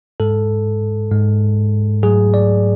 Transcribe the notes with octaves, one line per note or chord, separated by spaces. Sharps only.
G#2 G#3 A4
G#2 G#3
G#2 F#3 A3 G#4
D5